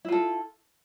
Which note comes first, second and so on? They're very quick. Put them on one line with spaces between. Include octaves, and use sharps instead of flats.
E4 F4 A4